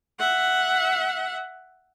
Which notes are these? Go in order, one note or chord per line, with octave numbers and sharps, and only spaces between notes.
E5 F#5